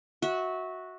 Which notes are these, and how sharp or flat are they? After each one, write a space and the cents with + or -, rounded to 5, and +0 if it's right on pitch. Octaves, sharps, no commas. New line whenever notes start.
F#4 -5 E5 -25